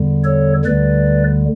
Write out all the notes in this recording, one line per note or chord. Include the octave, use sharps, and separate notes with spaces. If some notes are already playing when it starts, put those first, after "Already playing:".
Already playing: E2 D3 G3
A4 C#5
D2 D3 G3 B4 D5